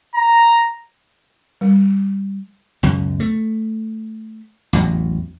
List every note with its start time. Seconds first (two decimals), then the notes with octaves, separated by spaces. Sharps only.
0.15 A#5
1.61 G3
2.83 C#2 F#2 B2
3.20 A3
4.73 A1 E2 F#3